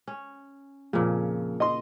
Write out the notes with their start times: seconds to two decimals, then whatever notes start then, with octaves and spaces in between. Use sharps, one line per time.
0.08 C#4
0.93 F2 A#2 C#3
1.60 D#5 C6